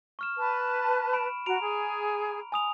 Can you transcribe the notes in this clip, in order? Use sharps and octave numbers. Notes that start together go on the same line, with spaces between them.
C#6 F6 E7
B4 A5
B5 D7 E7
F#4 A#5 D7 F7
G#4
G#5 D#6 F7